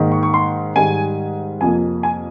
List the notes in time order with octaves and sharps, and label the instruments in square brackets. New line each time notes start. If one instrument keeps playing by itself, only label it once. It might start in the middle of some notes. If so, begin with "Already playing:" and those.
Already playing: [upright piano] G#2 D#3 A#3
C#6
C#6
C6
G#2 D#3 G3 G#5
F2 C3 F3 A#3 G#5
G#5